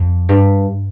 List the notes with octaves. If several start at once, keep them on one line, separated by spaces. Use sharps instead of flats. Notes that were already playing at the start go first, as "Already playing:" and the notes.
Already playing: F2
G2